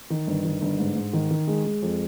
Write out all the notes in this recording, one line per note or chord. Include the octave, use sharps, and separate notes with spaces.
D#3
G1
D#3
G1
G#2
G#2
D#3
D#3
G#3
G#3
F2